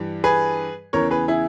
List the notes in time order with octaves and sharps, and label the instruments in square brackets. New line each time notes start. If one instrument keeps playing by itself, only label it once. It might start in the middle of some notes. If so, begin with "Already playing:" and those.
Already playing: [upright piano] G2 E3 G3
[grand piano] G#4 B4
[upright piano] E2 C#3 E3 [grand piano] A#4 C#5
[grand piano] G#4 B4
E4 G#4